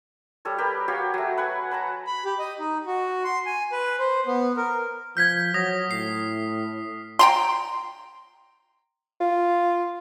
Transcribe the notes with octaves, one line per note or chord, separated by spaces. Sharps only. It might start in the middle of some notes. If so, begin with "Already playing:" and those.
G3 A4 C#5
G4 A#4 B4
F#4 G4 C#5 F5
F#3 A3
B4 F#5 G#5
B4 A5 A#5
B5
G4
D#5
D#4
F#4
C6
G#5
B4
C5
B3
A#4
F3 F6 G6 G#6 B6
F#3 D#6 A#6
A2 C7
G5 A#5 C6
F4